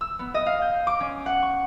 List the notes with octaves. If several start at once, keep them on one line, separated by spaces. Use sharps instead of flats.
E6
B3
D#5
F5
G6
D6
C#4
F#5
C#6